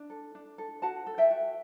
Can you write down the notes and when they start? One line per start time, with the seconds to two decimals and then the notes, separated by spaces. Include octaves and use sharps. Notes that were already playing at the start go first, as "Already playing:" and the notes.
Already playing: D4
0.10 A4
0.35 D4
0.58 A4
0.82 F#4 F#5 A5
1.07 A4
1.18 E5 G5
1.31 F#4